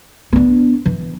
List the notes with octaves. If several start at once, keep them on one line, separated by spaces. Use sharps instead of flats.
B3 D4
E3